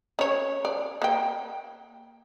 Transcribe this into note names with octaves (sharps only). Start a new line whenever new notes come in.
C#4 C#5
D5
A#3 G5